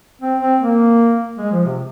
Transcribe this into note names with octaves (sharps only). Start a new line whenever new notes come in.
C4
C4
A#3
G#3
F3
C3